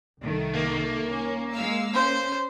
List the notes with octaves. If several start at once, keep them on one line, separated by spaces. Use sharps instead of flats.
C2 D#3 A3
A#3
C#4
G#3 F5 E6
C#4 C5